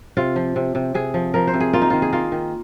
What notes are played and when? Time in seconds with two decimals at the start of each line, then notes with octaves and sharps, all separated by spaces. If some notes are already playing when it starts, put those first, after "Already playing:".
0.17 C3 F4
0.36 F3
0.56 C3
0.75 C3
0.94 C3 G#4
1.14 F3
1.34 F3 A#4
1.47 C5
1.54 C3
1.60 G#4
1.73 A#3 F4
1.82 D#4
1.90 D#3 F4
2.02 G#4
2.13 A#3 F4
2.32 D#3